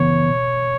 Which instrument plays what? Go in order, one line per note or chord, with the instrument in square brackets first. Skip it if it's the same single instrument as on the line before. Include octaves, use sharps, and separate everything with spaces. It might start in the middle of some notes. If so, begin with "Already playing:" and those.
Already playing: [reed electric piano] F#2 C#3 E3 B3 [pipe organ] C#5
[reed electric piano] B2